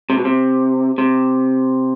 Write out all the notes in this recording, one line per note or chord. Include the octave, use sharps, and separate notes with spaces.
C3
B2
C3
C3